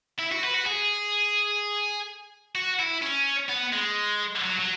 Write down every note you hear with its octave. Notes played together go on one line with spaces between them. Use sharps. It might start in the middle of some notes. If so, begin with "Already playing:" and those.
E4
F#4
B4
F#4
G#4
F#4
E4
C#4
B3
G#3
F#3
F#3